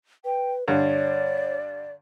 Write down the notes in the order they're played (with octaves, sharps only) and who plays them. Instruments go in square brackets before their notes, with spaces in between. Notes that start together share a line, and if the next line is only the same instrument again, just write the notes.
[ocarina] B4 [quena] G5
[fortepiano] G2 D3 [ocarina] C#5 [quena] D5